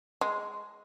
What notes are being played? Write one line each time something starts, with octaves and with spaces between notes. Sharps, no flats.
G#3